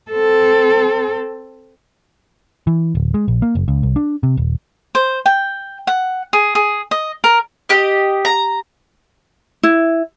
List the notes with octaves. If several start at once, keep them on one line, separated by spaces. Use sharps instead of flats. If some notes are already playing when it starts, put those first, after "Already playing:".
C4 A4
E3
D1
G#3
A#1
A#3
F#1
C#2
C2
D4
C3
D#1
C5
G5
F#5
G#4
G#4
D#5
A#4
G4 D#5
A#5
E4